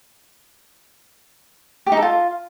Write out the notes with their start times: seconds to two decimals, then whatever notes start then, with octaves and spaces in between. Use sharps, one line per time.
1.86 G4
1.92 D#4
1.97 A4
2.02 F4